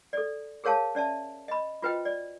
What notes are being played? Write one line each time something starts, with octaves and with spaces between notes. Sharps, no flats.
A4 D5
G#4 A#4 C#5 F5 A5
C#4 D5 E5 A5
D#5 B5
F4 F#4 B4 C5 D#5 G5
D5